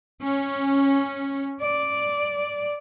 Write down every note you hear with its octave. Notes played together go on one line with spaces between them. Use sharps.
C#4
D5